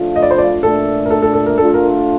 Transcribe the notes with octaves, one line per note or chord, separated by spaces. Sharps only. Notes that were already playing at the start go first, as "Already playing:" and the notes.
Already playing: F3 A3 D4 F4
D#5
D5
C5
D5
A#2 A3 D4 A4
A#4
A4
A4
A4
A#4
A3 D4 F4 A4
A#4